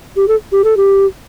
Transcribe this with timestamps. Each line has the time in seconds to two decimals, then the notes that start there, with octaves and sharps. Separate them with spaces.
0.16 G4
0.28 A4
0.52 G4
0.64 A4
0.77 G4